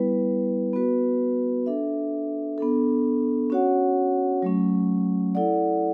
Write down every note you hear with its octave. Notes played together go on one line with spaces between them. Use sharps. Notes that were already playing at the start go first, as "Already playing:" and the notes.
Already playing: G3 B3 E4 B4
B3 F#4 B4
D4 A4 E5
B3 D4 A4
C#4 F#4 C#5 F#5
F#3 A3 C#4
E4 A4 D5 F#5